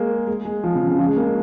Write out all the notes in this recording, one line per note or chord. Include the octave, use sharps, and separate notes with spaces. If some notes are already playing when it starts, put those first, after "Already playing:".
Already playing: G#3 A#3
G#3
G#3
F3
C#3
C#3
F3
G#3
A#3
G#3